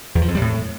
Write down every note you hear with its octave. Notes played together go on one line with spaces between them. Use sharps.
E2
F3
F2
G3
A2